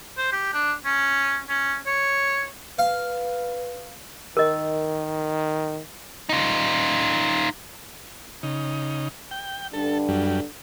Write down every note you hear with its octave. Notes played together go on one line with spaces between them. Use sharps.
C5
G4
D4
C#4
C#4
C#5
B4 F5
D#3 A#4 D#5
D#4 F4
C#3 D#4
G5
G2 D3 D4 A4
F#2 G3